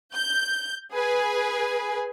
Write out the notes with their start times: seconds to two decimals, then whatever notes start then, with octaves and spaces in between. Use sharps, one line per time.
0.14 G6
0.93 G#4 B4 G#5